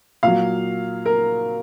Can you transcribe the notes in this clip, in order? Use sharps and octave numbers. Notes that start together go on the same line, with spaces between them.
A#2 F#3 F5
A#4